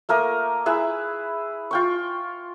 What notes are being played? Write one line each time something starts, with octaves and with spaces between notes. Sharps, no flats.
A3 A#3 A#4 D#6
E4 G#4 B4 E5
F4 G5 C#6